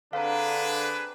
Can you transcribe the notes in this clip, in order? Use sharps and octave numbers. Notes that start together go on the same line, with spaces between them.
D3 C4 D4 G#4 B4 F5 A#5